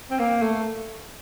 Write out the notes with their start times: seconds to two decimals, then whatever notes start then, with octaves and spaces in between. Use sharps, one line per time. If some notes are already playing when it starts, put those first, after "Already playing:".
0.10 C4
0.19 A#3
0.42 A3